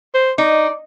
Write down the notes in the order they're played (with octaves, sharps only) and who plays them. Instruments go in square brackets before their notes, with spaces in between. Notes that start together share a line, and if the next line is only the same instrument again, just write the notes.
[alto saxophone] C5
[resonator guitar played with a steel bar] D#4 [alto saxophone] D5